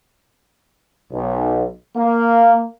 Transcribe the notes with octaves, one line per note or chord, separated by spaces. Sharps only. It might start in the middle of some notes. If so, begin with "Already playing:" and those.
B1
A#3